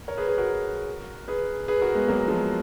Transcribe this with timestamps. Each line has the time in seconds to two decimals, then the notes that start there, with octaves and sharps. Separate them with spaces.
0.08 A#4 C#5
0.18 G#4 B4
0.28 G#4 B4
0.38 F#4 A#4
1.28 G#4 B4
1.68 G#4 B4
1.81 F#4 A#4
1.95 G#3 B3
2.08 F#3 A#3
2.28 F3 G#3